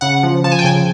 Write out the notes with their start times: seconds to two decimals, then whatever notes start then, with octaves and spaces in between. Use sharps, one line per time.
0.01 C#3 F#5
0.23 F3
0.44 F3 A5
0.52 G#5
0.59 G5
0.64 C#3 G#5